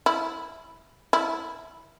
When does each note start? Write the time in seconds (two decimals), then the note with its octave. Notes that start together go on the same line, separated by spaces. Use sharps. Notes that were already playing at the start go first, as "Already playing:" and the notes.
0.06 E4
1.13 E4